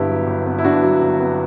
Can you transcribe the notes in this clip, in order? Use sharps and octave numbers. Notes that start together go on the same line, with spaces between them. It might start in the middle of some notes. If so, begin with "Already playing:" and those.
Already playing: G1 G2 B3 E4 G4
F#3
G1
B3
E4
G2 D4 F#4
F#3
G1
B3